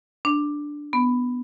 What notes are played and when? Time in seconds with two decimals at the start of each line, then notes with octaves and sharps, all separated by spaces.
0.25 D4
0.93 B3